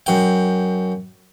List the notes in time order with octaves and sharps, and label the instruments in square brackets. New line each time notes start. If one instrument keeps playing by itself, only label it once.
[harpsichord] F#2 G5